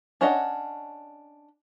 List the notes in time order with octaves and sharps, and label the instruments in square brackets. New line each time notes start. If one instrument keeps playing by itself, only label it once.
[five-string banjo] C#4 D4 C#5 D#5 F#5